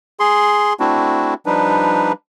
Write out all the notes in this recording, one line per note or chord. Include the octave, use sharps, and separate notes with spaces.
G#4 C6
A3 C4 D4 E4 F#4
F3 G3 D4 D#4 B4